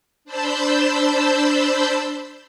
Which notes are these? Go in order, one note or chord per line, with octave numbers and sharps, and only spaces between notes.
D4 C5 A5 B5 E6 G6